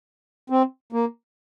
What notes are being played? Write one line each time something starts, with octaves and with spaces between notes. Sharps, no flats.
C4
A#3